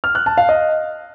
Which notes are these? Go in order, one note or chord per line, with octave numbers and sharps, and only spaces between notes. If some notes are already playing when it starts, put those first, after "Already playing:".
F6
F#6
A5
F5
D#5